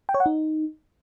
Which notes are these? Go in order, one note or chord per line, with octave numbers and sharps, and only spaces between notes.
G5
C#5
F#5
D#4